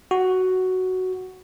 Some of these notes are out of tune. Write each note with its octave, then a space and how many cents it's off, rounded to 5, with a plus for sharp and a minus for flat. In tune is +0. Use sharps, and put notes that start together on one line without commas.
F#4 +5